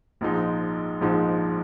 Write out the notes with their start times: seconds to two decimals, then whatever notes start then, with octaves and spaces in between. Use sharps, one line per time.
0.21 A#1 G#2 F3 G#3 D#4
1.01 A#1 G#2 F3 G#3 D#4